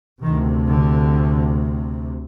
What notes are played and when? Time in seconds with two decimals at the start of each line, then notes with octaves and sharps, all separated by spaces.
0.22 D2 C3 D#3
0.69 D3